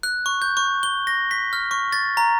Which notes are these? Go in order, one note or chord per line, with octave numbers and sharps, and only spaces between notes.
F#6
C#6
G6
C#6
G7
A#6
B6
F6
C#6
A6
A#5